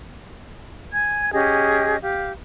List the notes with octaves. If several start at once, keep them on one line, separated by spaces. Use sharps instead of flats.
G#5 G#6
C#4 G4 G#4 D#5
G4 F5